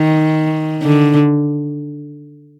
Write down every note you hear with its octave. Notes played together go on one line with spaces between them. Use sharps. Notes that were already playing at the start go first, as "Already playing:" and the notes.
Already playing: D#3
D3